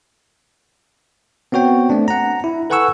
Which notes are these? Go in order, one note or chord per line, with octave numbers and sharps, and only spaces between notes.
B3 C4 F#4 C#5 G5
A3 C4 D4
F#5 A#5
E4
A4 B4 F#5 G#5 C#6 E6